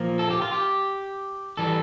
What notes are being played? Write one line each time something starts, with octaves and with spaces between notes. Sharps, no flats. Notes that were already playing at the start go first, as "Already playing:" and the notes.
Already playing: A#2 F3 A#3
A4
G4
F4
G4
E3 G3 A4